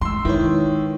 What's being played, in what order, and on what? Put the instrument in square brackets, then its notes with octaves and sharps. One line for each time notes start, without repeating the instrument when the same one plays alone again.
[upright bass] G#3 [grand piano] C6 E6
[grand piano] D#3 [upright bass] G#3 [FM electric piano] E4 B4 C#5